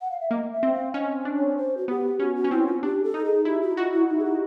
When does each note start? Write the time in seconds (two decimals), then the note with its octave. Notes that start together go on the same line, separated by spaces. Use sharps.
0.01 F#5
0.11 F5
0.21 E5
0.31 A#3 D#5
0.52 E5
0.63 C4
0.73 F5
0.94 C#4 D#5
1.25 D4
1.36 C#5
1.57 C5
1.77 F#4
1.88 B3 G4
2.19 C#4 F#4
2.36 F#4
2.44 C#4
2.51 C4 E4
2.67 F4
2.83 D4 G4
3.04 A4
3.14 D#4
3.25 G#4
3.45 E4 G4
3.62 F#4
3.77 F4 F#4
3.93 E4
4.09 D#4
4.19 G#4
4.25 G4